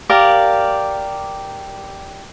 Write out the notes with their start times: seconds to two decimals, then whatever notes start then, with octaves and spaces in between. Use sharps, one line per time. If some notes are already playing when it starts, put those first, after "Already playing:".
0.09 G4 A#4 D5 F5